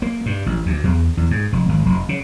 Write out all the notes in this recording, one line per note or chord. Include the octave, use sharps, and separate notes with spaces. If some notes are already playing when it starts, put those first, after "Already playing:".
A#3
G2
A1
D2
E2
E2
G#2
F1
G#1
F1
C#3